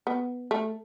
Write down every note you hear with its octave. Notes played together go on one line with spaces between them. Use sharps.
B3
A3